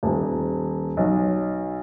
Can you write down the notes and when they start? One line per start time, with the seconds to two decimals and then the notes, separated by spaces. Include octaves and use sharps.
0.03 D#1
0.97 B1